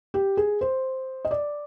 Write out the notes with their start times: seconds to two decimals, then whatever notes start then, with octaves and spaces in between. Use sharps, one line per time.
0.14 G4
0.37 G#4
0.61 C5
1.25 D#5
1.31 D5